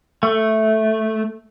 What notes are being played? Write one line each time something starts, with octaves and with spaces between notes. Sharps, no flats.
A3